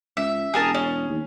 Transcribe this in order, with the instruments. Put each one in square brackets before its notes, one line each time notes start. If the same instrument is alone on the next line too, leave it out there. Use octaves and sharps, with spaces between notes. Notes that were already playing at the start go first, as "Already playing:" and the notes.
[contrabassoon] C#2 [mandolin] E5
[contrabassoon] E1 [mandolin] G#4 A#4 A5
[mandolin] C#4
[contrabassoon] D#2